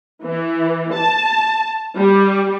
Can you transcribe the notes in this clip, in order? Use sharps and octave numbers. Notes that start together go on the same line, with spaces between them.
E3
A5
G3